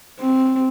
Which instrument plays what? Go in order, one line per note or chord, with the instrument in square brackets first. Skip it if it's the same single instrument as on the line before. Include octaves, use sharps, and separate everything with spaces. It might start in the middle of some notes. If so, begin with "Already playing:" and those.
[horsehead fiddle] C4